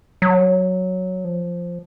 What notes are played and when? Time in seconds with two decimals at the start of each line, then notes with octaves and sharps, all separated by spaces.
0.22 F#3
1.25 F3